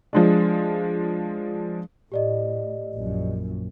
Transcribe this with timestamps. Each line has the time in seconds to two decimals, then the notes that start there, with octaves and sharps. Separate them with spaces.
0.13 F3 G#3 D4
2.12 A2 G4 D5 D#5
2.95 A#1 F#2